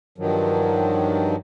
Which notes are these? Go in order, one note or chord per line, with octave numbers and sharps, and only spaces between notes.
G2 D#3 F3 F#3